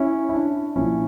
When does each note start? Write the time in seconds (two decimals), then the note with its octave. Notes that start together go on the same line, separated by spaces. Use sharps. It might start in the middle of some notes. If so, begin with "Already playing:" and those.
Already playing: C#4 E4
0.29 E4
0.33 D4
0.76 A#2 F3 C#4 E4